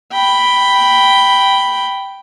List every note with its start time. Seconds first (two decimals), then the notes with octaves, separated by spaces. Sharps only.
0.12 G5 B5